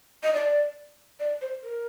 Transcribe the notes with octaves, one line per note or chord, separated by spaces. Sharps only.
D#5
D5
D5
C5
A#4